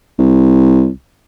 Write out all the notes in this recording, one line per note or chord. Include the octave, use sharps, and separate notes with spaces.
C2